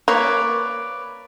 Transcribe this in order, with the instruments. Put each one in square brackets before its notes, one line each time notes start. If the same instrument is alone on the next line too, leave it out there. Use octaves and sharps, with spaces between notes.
[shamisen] A#3 [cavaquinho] B4 C#5 D5